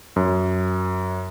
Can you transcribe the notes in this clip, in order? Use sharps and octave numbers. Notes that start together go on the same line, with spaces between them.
F#2